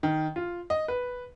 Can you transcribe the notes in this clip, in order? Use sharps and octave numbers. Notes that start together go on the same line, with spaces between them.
D#3
F4
D#5
B4